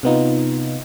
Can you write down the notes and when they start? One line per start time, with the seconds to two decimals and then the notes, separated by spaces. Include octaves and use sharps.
0.03 C3 B3 D#4 F4